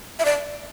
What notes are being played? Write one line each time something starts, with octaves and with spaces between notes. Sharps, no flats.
E5
D5